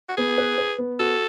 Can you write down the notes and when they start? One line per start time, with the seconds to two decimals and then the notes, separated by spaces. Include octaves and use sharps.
0.09 F#4
0.17 B3 G#4
0.38 B4
0.58 B4
0.78 B3
1.00 F#4 A4